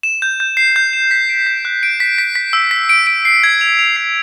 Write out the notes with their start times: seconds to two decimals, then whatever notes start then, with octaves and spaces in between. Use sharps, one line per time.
0.03 E7
0.22 G6
0.40 G6
0.57 C7
0.76 G6
0.93 E7
1.11 B6
1.29 D7
1.46 B6
1.65 F#6
1.83 D7
2.00 B6
2.18 B6
2.35 B6
2.53 E6
2.71 B6
2.89 D7
3.07 D7
3.25 C7
3.44 G#6
3.61 F7
3.79 F7
3.96 C7